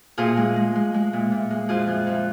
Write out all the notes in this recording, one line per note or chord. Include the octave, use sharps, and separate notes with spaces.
A#2 F4 G#4
G#3
G#3
G#3
G#3
A#2
A#2
G#3
F2 F4 G#4
F2
F2